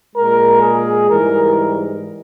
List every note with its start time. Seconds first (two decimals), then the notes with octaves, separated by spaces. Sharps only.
0.15 A#2 G#3 A#4
0.62 G#4
1.08 G#2 E3 G3 A#4